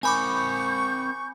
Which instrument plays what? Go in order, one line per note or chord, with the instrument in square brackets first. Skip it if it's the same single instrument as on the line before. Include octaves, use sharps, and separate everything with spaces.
[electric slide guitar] C4 A#4 C5 [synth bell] G#5 B5 D6 [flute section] C#6 G6